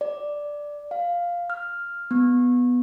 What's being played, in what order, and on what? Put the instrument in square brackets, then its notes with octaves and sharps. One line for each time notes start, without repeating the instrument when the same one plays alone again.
[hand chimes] D5
F5
F6
B3